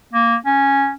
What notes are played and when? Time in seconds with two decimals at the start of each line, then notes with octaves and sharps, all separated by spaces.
0.13 A#3
0.46 C#4